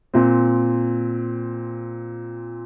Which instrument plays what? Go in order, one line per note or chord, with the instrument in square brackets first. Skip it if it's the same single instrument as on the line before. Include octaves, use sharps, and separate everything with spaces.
[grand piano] A#2 C4